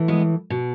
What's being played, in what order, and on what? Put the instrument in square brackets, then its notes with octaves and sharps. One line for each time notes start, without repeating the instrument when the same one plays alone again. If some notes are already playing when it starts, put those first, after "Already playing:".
Already playing: [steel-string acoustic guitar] A2 E3
G#3 B3
B2